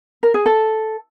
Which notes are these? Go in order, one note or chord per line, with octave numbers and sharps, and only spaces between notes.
A#4
G#4
A4